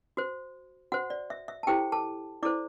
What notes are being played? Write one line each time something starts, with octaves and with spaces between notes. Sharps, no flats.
F#4 C5
F#4 C5 F#5
D5
E5
E5
A5
E4 G4 A4 C5 G5
A4 A5
E4 A4 C5 D5 D6